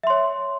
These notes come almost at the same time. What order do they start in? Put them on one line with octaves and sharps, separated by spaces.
E5 C6 C#5